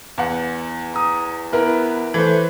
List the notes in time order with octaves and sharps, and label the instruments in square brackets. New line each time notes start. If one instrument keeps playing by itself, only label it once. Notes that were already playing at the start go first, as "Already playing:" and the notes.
[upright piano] E2 F#5
[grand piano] A#5 D#6
[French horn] B3 [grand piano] E4 A#4 B4
[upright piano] E3 [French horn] A3 [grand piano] B4 C5